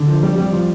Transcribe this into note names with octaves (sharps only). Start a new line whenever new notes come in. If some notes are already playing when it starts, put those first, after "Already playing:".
Already playing: D3
F3
F2 G3
F2 G3
F3